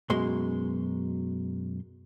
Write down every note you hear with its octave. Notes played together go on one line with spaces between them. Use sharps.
F#2 B2 G#3 C6